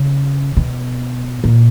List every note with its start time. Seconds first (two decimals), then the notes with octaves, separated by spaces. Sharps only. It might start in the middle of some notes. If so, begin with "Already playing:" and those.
Already playing: C#3
0.57 B2
1.44 A#2